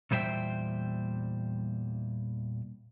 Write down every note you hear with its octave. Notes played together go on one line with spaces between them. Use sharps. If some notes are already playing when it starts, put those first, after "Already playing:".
E2 A#2 G3 C5 E5 G5